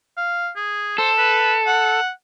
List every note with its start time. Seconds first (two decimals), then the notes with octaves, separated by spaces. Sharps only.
0.17 F5
0.56 G#4
0.98 A4 C5
1.18 B4
1.67 F#5